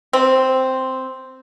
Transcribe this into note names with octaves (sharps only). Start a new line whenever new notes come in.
C4